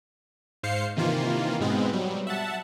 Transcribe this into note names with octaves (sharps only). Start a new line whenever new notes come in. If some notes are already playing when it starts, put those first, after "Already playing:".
G#2 C5 F5 C7 C#7
C3 D#3 E3 A#3 F4
G#2 B2 G#3 B3 C4
F#3 G3
E5 F#5 A5